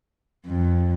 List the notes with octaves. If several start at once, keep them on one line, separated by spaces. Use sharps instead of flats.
F2